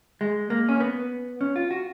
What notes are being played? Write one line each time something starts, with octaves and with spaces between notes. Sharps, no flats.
G#3
A#3
C#4
B3
C#4
F4
F#4